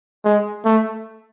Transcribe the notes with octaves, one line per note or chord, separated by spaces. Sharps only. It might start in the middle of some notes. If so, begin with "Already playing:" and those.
G#3
A3